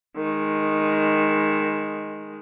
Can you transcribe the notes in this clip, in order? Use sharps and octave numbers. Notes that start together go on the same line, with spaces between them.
D#3 G#3